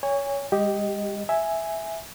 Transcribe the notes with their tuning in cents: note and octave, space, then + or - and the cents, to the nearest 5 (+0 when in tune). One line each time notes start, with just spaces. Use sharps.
C#5 +15 G#5 -30
G#3 -40 G4 +0 D#5 +0
E5 +0 G#5 +0